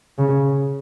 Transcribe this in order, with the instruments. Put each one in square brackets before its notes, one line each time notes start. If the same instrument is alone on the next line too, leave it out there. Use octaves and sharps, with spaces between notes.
[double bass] C#3